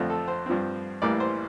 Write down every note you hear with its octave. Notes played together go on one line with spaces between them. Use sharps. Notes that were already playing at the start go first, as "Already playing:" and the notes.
Already playing: F2 D3 F3 A3 C4 F4
A4
C5
G2 F3 C4
A1 A2 E3 G3 A#3 D5
C5